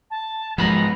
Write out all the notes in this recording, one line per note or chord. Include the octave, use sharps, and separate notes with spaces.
A5
G#2 F3 F#3 G#3 B3 A#5 B5